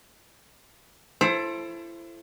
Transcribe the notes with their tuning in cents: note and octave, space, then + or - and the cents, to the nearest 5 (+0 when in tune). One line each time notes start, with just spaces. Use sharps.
E4 +35 A4 +0 C5 +20